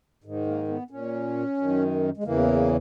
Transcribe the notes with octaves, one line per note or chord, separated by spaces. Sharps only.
G#2 D#3
A#3
B3
A#2 C#4
F#2 D#3
G#3
E2 C#3 E3 A#3